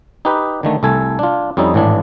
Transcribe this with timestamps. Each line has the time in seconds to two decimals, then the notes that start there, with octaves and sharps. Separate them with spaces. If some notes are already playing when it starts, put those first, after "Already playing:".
0.25 D#4 G4 B4
0.63 D3 D#3 A3
0.83 C2 A3 A4 G#5
1.19 D4 F4
1.57 F2 G3 C#4 D#4 E4
1.74 G#1 A2 E3 D4